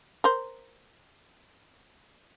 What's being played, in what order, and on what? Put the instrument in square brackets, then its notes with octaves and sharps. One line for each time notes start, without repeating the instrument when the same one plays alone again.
[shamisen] A#4 C5